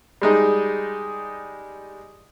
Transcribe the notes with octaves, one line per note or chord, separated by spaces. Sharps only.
G3 G#3 D#4